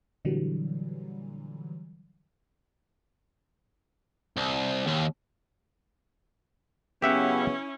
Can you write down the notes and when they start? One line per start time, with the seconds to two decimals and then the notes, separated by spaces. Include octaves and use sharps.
0.25 A#2 D3 E3 F#3 G3
4.37 C2
4.88 D#2
7.02 C#3 F#3 B3 C#4 E4 G4 E5 F#5